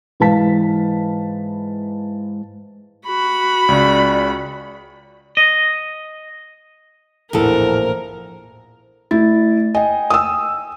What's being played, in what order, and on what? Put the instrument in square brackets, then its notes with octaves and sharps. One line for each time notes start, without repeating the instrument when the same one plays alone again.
[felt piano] G#2 E3 B4 F5 A5 B6
[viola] F#4 B5
[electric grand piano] C#2 C#3 [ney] D5
[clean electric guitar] D#5
[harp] A#1 A2 F#5 [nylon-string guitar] E2 A4 [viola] A#4
[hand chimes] A3 A6 [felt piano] E4
[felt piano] D#5 [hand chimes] G5 G#5
[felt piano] D#6 E6